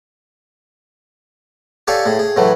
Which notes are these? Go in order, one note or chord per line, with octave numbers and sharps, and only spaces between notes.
G4 A4 C#5 D5 F5 G#5
A2 G#4
G#4
A2 E3 F#3 A3